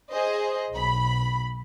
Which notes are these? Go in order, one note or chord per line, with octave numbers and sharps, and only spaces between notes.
G#4 C5 D#5
B1 B5